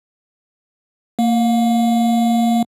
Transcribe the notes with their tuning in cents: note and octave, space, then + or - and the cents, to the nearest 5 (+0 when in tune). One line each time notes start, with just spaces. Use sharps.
A#3 -25 F5 +35